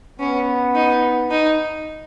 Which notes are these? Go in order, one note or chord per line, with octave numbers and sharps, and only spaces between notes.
B3 C#4
D#4
D#4